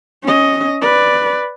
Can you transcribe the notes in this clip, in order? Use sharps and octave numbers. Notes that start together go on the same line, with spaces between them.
C#4 D#5
B4 D5